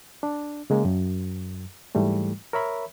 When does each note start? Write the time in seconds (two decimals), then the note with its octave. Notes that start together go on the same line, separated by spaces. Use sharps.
0.23 D4
0.70 C#3 G#3 A#3
0.85 F#2
1.95 G#2 E3 G3 A3
2.53 A#4 C#5 E5 B5